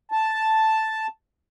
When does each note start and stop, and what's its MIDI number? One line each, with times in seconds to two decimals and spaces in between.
0.12 1.07 81